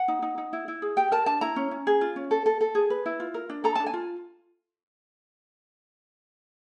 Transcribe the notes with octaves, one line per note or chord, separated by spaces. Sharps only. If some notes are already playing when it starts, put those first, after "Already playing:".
Already playing: F#5
D#4
D#4
D#4
E4
E4
G#4
G4 G5
A#4 A5
D4 A5
E4 A#5
C#4
C#4
G#4
F4
C#4
A4
A4
A4
G#4
B4
E4
F4
A#4
D4
A4 A#5
A5
D4
G#5
F4